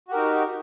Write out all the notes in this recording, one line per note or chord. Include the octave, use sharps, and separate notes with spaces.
D#4 F#4 G4 A#4